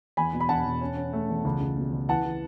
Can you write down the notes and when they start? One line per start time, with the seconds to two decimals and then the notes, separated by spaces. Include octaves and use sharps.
0.17 E2 G#5 B5
0.33 B2
0.40 B5
0.49 E1 F#5 A5
0.65 E1
0.81 C#4
0.97 C#4
1.13 A3
1.29 E2
1.45 C#2
1.61 C#2
1.77 B2
1.93 C#2
2.09 E3 F#5 A5
2.25 E3